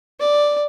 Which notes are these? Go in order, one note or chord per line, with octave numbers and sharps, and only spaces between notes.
D5